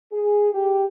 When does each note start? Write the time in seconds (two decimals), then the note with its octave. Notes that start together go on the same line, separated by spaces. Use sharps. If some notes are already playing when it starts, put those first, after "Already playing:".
0.13 G#4
0.53 G4